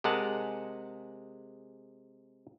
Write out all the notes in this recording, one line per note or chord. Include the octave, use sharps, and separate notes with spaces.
C3 G#3 G#4 A#4 F#5 A5